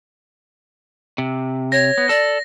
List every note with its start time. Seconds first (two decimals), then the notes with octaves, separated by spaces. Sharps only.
1.18 C3
1.72 C#5 A#6
1.98 B3
2.09 A4 D5